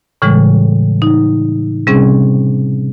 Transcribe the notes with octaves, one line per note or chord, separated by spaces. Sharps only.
A2 C#3 E3 G3 G#3
D#4
C3 G3 C4 C#4 G#4